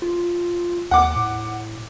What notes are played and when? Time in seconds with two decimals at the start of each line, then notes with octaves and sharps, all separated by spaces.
0.02 F4
0.91 D#2 F#5 D6
1.16 A2